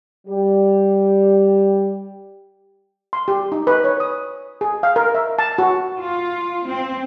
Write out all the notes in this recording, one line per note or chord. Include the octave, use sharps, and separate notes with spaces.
G3 G4
C6
G4
D#4
B4
C#5
D#6
G#4
F5
A#4
E5
A5
F#4
F4
C4